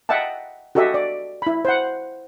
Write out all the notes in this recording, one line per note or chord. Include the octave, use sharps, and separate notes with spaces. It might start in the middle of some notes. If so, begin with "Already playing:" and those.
D#5 E5 F#5 G5 A5
F#4 G4 A4 D#5 E5
D5
E4 B5
C5 F#5